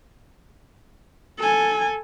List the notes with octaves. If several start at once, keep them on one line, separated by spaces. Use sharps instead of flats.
A4 G#5